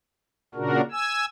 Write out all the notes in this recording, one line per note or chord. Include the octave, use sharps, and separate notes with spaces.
A#2 C#3 D4 F#4 A#4
G#5 E6